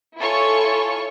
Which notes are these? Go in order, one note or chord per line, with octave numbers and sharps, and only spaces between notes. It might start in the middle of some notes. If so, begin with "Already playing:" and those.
E4 F4 A4 C#5 G#5 C#6